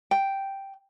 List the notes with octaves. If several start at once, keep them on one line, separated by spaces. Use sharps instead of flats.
G5